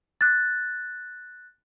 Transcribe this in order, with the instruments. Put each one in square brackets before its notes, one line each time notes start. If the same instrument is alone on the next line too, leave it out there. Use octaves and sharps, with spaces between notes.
[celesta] F#6 A6